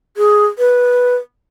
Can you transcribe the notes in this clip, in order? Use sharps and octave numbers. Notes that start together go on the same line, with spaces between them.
G#4
B4